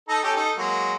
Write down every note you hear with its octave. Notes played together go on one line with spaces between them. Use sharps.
D#4 A4 A#5
C#4 G4 A4
D#4 A4
F#3 G#3 A#3